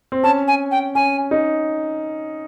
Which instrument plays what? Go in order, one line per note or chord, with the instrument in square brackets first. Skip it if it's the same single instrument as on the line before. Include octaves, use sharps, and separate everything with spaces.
[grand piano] C4
[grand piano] C#4 [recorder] A5
[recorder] G#5
G5
[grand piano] C#4 [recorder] G#5
[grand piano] D#4